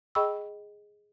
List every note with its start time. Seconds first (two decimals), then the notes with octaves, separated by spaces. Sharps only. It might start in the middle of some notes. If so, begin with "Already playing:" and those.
0.15 G#4 D#5 G5 B5 C#6 E6